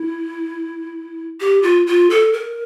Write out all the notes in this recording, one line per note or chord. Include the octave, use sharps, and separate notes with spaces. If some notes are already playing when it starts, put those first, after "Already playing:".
Already playing: E4
G4
F4
F4
A4
A#4